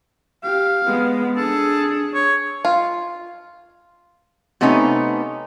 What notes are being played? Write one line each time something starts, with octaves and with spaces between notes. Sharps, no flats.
G4 F5
G#3 B3
D4 G#4 A4
C#5
F4
C3 A3 B3 C#4 D#4